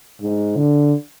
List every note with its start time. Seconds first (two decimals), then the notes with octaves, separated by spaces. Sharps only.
0.21 G#2
0.57 D3